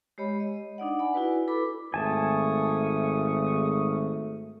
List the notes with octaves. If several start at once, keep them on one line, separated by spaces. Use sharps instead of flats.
G#3 G4 C#5 D#5 B5
D#5
D4 D#4 D5 F#5
D5 F#5 G#5 B5
E4 F#4 B4
E4 A4 B4 B5 D6
G#1 A3 F5 G#5 A5 C#6 D#6